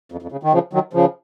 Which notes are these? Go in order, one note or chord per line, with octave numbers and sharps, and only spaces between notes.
F2
F2
C#3
D#3
C#3 F3
D#3 F#3
C#3 F3